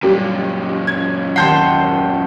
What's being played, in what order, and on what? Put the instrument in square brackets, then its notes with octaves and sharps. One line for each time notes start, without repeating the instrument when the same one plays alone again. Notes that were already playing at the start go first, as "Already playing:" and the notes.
[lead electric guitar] F#2 A#2 [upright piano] G3
[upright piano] G#6
[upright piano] D#2 G6 C7 [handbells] F#5 A5 C6